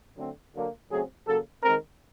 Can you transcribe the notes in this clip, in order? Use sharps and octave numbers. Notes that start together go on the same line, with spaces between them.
D3 F#3 A3 C4
D3 F#3 A#3
C#3 F#3 A3 C4 G#4
C#3 F#3 A#3 A4
D#3 G#3 C4 A#4